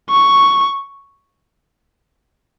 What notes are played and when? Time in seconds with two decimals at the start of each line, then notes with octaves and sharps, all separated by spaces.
0.11 C#6